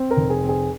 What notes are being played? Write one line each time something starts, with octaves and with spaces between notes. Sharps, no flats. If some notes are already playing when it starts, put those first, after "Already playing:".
Already playing: C4
A#4
F1
G#4
C4
G#4